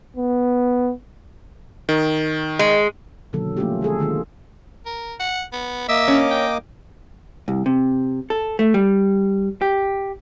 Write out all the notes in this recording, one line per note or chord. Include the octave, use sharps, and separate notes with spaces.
B3
D#3
G#3
B2 D3 D#3 F#3 A#3 A4
F3 A3 A#3 C#4 F4 G4
D3 G#3 G#4 A4
D3 D#3 A#3 F4
A#4
F#5
B3
A#3 D#5 E5 D6
C#4
G5
C2
C3
A4
A3
G3
G4